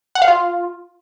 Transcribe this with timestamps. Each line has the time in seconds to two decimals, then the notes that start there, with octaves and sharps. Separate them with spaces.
0.15 F#5
0.22 F5
0.28 F4